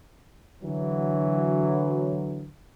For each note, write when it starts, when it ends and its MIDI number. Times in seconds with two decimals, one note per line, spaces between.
0.64 2.48 50
0.64 2.48 52
0.64 2.48 54